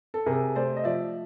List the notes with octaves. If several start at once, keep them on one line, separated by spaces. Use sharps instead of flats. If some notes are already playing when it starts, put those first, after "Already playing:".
A4
C3 G#4 A#4
A3 C5 D5
D#5
F3 D5 E5